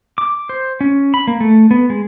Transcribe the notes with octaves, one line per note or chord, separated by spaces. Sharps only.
D6
C5
C#4
B5
A#3
A3
B3
G#3